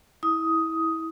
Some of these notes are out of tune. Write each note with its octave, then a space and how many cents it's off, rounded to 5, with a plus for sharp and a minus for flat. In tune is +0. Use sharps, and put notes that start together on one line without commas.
E4 -25 D#6 +10